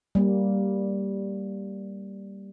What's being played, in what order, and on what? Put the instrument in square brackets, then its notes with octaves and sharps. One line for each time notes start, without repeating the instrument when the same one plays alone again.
[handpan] G3 A#3